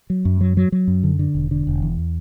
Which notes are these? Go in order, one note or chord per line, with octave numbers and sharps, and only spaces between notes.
F#3
F#2
F#3
F#3
F#3
F#2
D3
D3
E1
D3
E1
E2